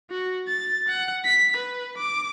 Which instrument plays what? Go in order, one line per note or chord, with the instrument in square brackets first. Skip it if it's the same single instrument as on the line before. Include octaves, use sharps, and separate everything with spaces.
[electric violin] F#4
A6
F#5
B6
B4
D6